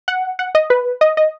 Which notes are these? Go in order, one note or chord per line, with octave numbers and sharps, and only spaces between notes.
F#5
F#5
D#5
B4
D#5
D#5